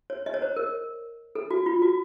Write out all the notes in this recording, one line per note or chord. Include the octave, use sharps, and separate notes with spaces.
C#5
D#5
C#5
C5
A#4
A4
F#4
F4
F#4